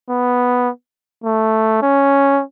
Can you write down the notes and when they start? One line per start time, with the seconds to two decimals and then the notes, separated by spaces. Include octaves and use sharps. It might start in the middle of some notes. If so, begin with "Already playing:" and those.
0.09 B3
1.24 A3
1.82 C#4